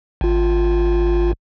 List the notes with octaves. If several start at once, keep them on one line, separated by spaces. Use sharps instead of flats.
G#1 F4